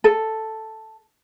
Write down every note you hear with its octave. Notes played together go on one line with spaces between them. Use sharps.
A4